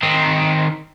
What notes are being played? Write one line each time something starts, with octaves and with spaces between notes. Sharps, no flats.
D#3 C4